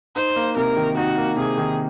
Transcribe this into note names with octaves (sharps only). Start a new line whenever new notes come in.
D#4 C5
A#3
C3 A#4
D#3
D#4 F#4
A#3
C3 G#4
D#3